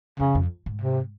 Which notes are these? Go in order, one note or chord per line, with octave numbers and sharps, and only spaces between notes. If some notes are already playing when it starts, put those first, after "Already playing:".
F2 C#3
F2
G#2
C3